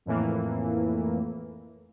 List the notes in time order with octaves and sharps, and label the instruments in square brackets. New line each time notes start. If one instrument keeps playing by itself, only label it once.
[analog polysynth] F2 A2 E3 A#3